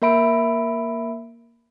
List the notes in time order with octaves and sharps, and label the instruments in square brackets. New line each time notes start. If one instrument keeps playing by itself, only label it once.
[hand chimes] A#3 A#4 E5 B5 D7